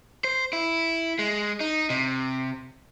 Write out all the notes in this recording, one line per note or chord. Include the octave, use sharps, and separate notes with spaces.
C5
E4
G#3
D#4
C3